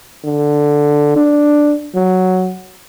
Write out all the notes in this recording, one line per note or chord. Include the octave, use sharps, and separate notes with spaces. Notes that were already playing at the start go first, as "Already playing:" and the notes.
D3
D4
F#3